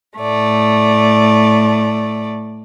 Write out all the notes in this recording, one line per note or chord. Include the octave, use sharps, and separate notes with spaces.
A2 A3 D5